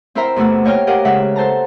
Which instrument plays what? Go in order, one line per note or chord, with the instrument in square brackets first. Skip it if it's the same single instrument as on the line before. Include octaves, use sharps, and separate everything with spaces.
[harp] C4 E4 A#4 C5 E5 A#5
E2 C3 A3 F#4 E6
A#3 C#5 D#5 G5 F6
G4 A#4 D#5 F5 F#5
C#3 G#3 E5 F#5
A4 C5 A5 A#5